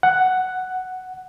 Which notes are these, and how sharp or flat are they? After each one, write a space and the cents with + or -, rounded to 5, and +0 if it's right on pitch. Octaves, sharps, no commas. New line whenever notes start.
F#5 +5